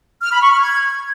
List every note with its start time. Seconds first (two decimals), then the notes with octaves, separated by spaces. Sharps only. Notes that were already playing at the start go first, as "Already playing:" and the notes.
0.23 F6
0.32 B5
0.42 C#6
0.51 F6
0.61 G#6